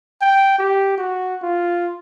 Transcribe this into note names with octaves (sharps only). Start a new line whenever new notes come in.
G5
G4
F#4
F4